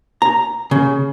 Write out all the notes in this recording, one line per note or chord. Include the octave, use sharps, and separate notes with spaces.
A#5
C#3